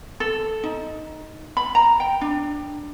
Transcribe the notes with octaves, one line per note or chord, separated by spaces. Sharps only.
A4
D#4
B5
A#5
G5
D4